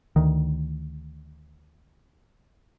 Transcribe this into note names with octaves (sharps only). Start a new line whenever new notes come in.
D2 D#3